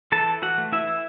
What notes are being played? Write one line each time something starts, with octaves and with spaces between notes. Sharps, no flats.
E3 A4 A5
E4
E3 F#4 F#5
A3
E3 E4 E5
E4